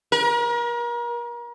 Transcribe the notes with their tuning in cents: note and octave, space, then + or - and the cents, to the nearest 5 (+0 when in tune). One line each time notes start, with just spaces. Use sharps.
A#4 +35